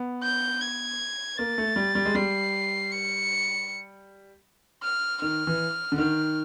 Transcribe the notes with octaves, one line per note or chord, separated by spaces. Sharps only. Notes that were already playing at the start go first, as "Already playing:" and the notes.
Already playing: B3
G6
G#6
A#3 A6
A3
G3
G3
G#3
G3 C7
C#7
F6
D#3 F6
E3
D3
D#3 F6